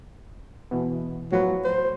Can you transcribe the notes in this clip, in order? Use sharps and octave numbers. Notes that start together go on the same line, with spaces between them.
B2 E3 B3
A2 F3 F#3 B4
C5